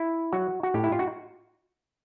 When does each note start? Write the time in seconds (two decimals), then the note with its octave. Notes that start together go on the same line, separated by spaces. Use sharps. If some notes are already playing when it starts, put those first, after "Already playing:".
Already playing: E4
0.33 F#3 F#4
0.63 F#4
0.74 A2 G4
0.84 E4
0.92 F4
0.99 F#4